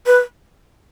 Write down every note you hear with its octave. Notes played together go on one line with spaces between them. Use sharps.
B4